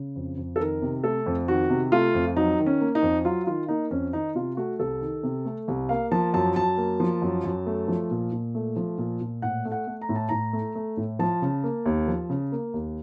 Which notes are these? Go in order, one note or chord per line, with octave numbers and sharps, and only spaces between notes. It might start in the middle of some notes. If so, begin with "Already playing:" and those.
Already playing: C#3
F2
F2
A4
D#3 A#4
C3
A3 A4
F2
D#3 F#4
C3
A3 F4
F2
F#3 D#4
D#3
C#4
A#3
D#4
F2
F#3 F4
D#3 F4
A#3 D#4
F2 C#4
D#3 D#4
C3 F4
A3 F#4
C2 A4
D#3
C3
A3
C2
A#3 F5
F3 A5
F#2 A5
F#2 A5
A#3
F3
F#2
F#2
A3
F3
A#2
A#2
A3
F3
A#2
A#2
A2 F#5
A3
F#5
A3
A#5
A2
A5
A2 A#5
A3
A3
A2
F3 A5
C#3
A#3
D#2
F3
C#3
A#3
D#2